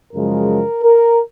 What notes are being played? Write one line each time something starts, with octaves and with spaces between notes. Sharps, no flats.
F#2 C#3 F3 G#3 A#4
A#4